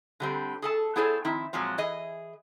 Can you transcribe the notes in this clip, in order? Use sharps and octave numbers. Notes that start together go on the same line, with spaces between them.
D3 G3 C4
G#4 A4 A5
B3 E4 G#4 A4 C5 C#5
D#3 F3 C4 E4
A#2 F3 F#3 G#3 C4
E3 G#4 D#5